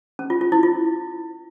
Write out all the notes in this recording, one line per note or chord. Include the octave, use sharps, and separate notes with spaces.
C#4
F4
F4
E4
F4